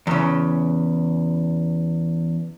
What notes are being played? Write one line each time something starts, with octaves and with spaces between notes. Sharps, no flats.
E2 C#3